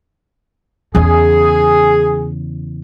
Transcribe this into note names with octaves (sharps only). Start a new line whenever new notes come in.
E2 C#3 G#4